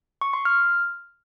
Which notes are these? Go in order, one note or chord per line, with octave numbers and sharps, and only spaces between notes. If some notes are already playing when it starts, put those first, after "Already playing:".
C#6
C6
F6